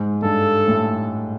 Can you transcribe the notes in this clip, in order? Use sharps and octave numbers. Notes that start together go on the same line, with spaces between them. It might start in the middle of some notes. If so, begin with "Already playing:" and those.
Already playing: G#2
G2 A4
A2